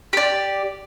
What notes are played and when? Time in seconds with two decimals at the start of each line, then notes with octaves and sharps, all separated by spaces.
0.13 G4 D5